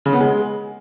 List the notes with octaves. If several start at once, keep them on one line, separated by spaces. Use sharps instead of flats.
C#3
B3
G#3